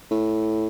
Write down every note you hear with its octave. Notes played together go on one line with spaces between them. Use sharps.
A2